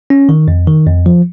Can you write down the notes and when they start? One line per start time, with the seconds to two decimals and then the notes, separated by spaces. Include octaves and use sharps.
0.10 C#4
0.29 D#3
0.48 F2
0.67 D#3
0.87 F2
1.06 F3